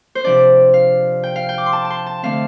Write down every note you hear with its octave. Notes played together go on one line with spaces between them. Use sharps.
C5
C3 F3 D4 D5
F5
G5
F5
G5
D6
C6
A5
A5
C6
A5
D3 A3 C4 F5